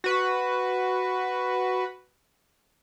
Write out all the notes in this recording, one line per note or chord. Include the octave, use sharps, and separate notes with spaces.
F#4 B4